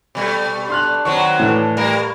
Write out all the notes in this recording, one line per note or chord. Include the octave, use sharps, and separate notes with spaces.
B2 G3 A3
D4 C6 F6 F#6
D#3 F#3 C4 C#6
A2 E3
G3 A#3 A#4